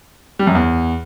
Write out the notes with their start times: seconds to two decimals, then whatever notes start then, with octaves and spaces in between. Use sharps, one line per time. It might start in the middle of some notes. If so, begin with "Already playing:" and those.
0.39 G3
0.47 F#2
0.55 E2